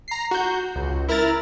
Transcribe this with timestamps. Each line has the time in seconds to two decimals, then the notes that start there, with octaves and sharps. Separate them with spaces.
0.08 A#5 C7
0.31 F#4 G6
0.75 C#2
1.09 E4 A#4 A#5 F6 A6